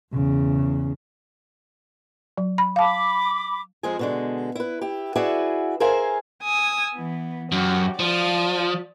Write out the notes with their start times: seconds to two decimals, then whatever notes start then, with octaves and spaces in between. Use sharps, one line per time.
0.13 E2 C#3
2.37 F#3
2.58 B5
2.76 F5 A5 B5 D6
3.83 F2 F3 G#3 G#4
3.99 B2 D3 G#3
4.55 E4 B4
4.81 E4 G4
5.15 E4 F#4 G#4 B4 D5 E5
5.80 G#4 A#4 C5 E5 F5 G#5
6.42 G#5 D#6 E6
6.96 E3 B3
7.52 F#2 F#4 G4
7.99 F3 D5 D#6